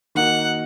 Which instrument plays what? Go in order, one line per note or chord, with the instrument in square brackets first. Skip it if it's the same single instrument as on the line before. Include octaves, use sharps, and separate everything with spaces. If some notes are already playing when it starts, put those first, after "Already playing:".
[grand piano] D#3 A#3 D#4 F#4 [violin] F#5